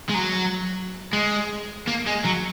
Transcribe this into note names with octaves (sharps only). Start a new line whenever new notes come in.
G#3
F#3
G#3
A#3
G#3
F#3